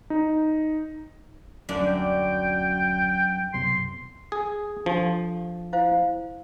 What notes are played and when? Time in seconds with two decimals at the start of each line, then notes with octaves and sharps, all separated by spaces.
0.10 D#4
1.69 D1 F#2 D4
1.87 G5
3.54 C2 F#2 B2 C6
4.32 G#4
4.86 F3 D4 G4 A4
5.73 E4 C5 F5